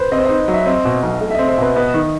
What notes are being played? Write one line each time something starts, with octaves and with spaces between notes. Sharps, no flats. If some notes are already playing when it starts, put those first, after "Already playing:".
Already playing: B4 C5
C4 D#5
C5
D#4 D#5
F#3
E5
C4 D#5
B2
B1
A3
E5
C4 D#5
C5
B2 B4
B3 D#5
D#3